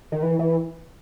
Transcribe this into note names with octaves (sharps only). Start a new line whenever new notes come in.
D#3
E3
E3